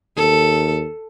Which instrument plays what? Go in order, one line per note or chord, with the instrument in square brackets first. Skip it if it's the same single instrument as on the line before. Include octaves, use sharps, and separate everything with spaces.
[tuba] D#2 [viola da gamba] A4